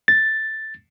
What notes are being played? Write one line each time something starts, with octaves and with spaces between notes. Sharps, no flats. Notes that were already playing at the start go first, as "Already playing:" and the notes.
A6